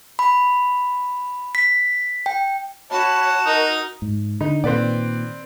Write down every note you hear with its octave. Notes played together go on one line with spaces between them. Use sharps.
B5
B6
G5
F#4 C#5 A5 B5
D#4 A#4 D#5
G#2
D3 D#4
A#2 D#3 C4 B4 D5